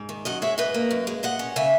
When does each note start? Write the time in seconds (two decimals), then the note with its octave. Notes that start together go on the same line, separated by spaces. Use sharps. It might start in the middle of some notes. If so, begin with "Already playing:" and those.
Already playing: G#2
0.09 D#3
0.25 F#2 D#5 F#5
0.42 G#3 C#5 E5
0.58 G#2 B4 D#5
0.74 A#3
0.91 F#2
1.07 G#3
1.23 A#2 D#5 F#5
1.39 C#4
1.56 C#3 E5 G#5